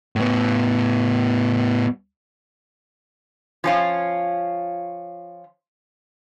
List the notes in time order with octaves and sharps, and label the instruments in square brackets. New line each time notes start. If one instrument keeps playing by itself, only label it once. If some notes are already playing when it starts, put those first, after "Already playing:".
[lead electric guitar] A2 B3
[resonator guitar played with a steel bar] F3 C#4 F4